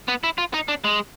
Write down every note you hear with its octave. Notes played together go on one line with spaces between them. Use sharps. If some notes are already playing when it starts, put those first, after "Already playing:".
B3
E4
F4
D#4
D4
G#3